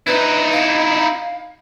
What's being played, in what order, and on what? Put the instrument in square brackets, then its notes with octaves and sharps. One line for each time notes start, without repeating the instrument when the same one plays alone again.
[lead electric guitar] D#4 E4 [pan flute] B4
[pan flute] F5